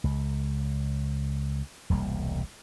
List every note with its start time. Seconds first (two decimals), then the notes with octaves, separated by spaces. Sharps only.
0.04 C#2
1.90 E1 C2 G3 A#3